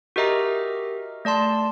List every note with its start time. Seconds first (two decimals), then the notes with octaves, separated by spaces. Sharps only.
0.16 F#4 G4 A#4 D#5 E5 A#5
1.25 A3 D5 A5 C6